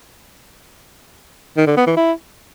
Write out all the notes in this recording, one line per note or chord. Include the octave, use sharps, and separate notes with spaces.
D#3
D3
B3
E3
E4